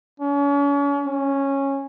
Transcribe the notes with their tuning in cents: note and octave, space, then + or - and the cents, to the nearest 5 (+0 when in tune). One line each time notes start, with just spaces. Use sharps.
C#4 +40
C#4 -10